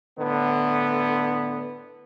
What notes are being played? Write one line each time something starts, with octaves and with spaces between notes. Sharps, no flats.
A2 D3 B3